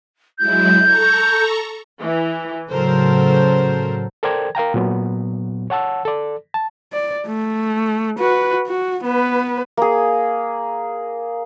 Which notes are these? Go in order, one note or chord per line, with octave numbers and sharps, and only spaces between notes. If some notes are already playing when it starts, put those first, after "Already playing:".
F#3 G#3 E4 G6
A4 A#5 C#6
E3
A2 C#3 F#3 A4 A#4 C5
A4 A#4 C5 D5 G5 G#6
A#4 F5 G5 A#5
A#2 F#3 B3
C#5 F#5 A5 E6
A4 D5
A5
D5
A3
F#4 B4
F#4
B3 B4
A#3 G#4